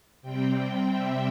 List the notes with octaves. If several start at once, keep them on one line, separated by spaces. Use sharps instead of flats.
C3 G3 C4 G5
E5